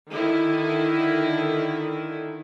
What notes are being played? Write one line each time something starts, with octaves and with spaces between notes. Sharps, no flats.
D3 D#3 E4